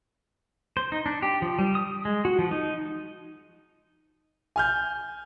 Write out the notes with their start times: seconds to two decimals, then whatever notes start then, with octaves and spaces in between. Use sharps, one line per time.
0.77 C5
0.92 D#4
1.06 D4
1.22 G4
1.42 F3
1.59 G3
1.75 D#6
2.05 G#3
2.25 F#4
2.39 F3
2.51 D#4
4.56 G#5 F6 G6